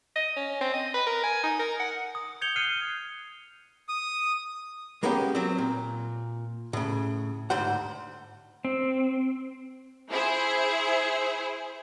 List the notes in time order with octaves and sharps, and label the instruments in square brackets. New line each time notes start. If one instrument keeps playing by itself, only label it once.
[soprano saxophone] D#5
C#4
C4
D#5
B4
A#4
G#5
D#4
A#4
F#5
[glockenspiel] D#6
G6 G#6 C#7 F7 G7
F6 F#6 C7 C#7 D#7
[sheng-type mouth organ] D#6
[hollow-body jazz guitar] G#3 A#3 B3 C#4 G4
F#3 C4
A#2
A2 C#3
D2 G#2 C5 F#5
[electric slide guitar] C4
[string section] E4 G#4 C5